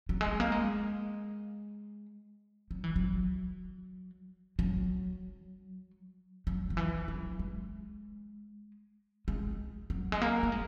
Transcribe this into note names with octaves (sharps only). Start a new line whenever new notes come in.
F#3
G#3
A#3
G#3
F#3
E3
F#3
F#3
F#3
D#3
E3
F#3
G#3
G#3
F#3
G#3
A#3
A#3
G#3